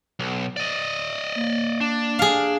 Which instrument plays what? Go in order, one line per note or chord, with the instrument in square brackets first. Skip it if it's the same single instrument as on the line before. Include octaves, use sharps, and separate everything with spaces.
[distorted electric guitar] B1
D5 D#5
[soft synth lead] A#3
[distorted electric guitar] D4
[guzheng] G#4 F5